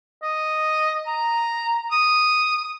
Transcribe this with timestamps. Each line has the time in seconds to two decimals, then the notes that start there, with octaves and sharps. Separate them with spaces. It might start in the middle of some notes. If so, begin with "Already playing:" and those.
0.23 D#5
1.07 A#5
1.91 D#6